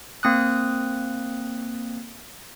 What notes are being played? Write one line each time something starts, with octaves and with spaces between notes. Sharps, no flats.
A#3 C4 D#6 F#6